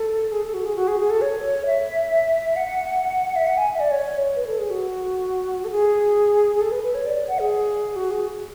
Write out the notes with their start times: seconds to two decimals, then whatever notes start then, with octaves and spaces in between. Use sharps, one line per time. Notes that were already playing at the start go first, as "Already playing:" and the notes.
Already playing: A4
0.32 G#4
0.43 A4
0.54 F#4
0.65 G#4
0.76 F#4
0.88 G#4
0.99 G#4
1.10 A4
1.22 C#5
1.66 E5
2.56 F#5
3.36 E5
3.47 F#5
3.58 G#5
3.75 E5
3.80 D5
3.91 C#5
4.36 B4
4.47 A4
4.59 G#4
4.70 F#4
5.65 A4
5.71 G#4
6.55 G#4
6.61 A4
6.72 B4
6.83 B4
6.95 C#5
7.06 D5
7.29 F#5
7.39 G#4
7.96 F#4
8.11 G#4